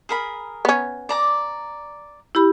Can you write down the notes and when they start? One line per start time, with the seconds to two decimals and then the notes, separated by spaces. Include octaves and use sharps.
0.09 G#4 A#4 B5
0.65 B3 C#4
1.09 D5 A#5 D6
2.35 E4 G4 B5